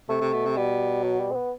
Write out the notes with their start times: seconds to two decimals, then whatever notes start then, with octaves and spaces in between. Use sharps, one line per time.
0.09 C3 A3
0.21 C3
0.33 B2
0.45 C3
0.57 B2 G3
1.04 F#3
1.20 G3
1.31 C4
1.35 B3